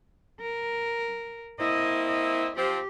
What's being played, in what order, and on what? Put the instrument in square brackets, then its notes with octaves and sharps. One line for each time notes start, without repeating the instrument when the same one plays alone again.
[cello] A#4
[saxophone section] A#3 C4 E4 [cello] D#5
[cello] D#5
[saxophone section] F3 C4 [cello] G4